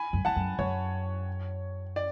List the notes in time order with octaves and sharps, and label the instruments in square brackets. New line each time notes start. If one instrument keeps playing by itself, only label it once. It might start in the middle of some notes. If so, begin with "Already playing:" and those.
Already playing: [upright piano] G#5 B5
[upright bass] F#2
[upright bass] E2 [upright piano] F#5 A5
[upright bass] F#2
[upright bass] F#2 [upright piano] C#5
[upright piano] D5